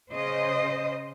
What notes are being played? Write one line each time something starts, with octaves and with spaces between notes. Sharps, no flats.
C#3 C5 D#5